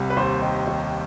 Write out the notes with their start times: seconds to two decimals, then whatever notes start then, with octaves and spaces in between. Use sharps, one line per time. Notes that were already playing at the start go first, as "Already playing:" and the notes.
Already playing: C2 C3
0.10 B4
0.17 D#2 C5
0.42 D#3
0.67 D#2